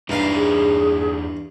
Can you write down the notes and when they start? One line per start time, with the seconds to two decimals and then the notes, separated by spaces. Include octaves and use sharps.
0.09 E2 G2 D#4 E4 F5
0.34 G#4